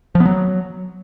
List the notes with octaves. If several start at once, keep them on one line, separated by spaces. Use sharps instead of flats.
F3
B3
F#3